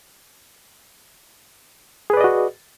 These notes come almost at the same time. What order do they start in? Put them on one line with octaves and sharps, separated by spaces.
G#4 B4 D5 D#5 F#4